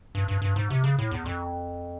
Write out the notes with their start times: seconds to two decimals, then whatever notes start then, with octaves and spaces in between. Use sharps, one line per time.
0.15 G2
0.28 G2
0.42 G2
0.56 G#2
0.70 C3
0.84 C#3
0.99 A2
1.11 E2
1.26 F2